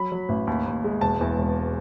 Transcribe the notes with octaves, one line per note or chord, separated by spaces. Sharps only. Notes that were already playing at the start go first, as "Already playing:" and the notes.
Already playing: F#3 B5
F#3
A1
D#2
D#2
G#3
E1 A5
E2
E1